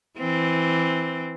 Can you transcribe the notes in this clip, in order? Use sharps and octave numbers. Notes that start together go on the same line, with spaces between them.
E3 C4